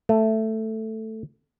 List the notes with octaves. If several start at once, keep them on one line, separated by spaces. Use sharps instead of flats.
A3